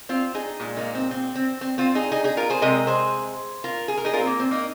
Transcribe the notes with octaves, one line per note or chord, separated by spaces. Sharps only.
C4 F4
D#4 G#4
A#2 G#3
A#3 D#4
C4
C4
C4
C4
C4 F4
D#4 G#4
D#4 G#4
D#4 G#4
F4 A#4
G#4 C5
C3 G#3 A#4 D#5
G#4 C5
F4 A#4
G#4
A#4
D#4 G#4
F4 A#4
C4
A#3
C4
A#3 D#4